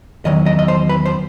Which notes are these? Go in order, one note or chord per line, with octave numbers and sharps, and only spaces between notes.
E2 D#3 F#3 D#5
D#5
D#5
C5
B4
C5